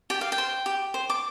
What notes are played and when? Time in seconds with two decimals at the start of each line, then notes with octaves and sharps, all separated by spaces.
0.10 G4 G5
0.21 F5
0.32 G5
0.38 C5
0.66 G4
0.94 C5
1.10 D6